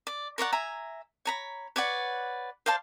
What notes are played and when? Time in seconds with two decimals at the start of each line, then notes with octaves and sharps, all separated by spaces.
0.07 D5
0.38 A#4 C#5 D5 F#5
0.52 E5 G#5 A#5
1.25 C#5 A#5 B5
1.76 B4 C#5 D5 F#5
2.66 C5 D5 F5 A5